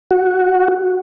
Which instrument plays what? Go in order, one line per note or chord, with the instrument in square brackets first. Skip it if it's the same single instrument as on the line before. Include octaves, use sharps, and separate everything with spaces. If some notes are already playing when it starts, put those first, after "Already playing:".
[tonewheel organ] F#4